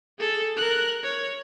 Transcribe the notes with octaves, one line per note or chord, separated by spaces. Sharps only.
G#4 A4
A#4 F#6
C#5